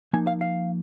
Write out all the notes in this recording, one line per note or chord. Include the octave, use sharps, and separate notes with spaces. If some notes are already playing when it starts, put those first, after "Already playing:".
F3 A#3 D#4 G#5
F5
F5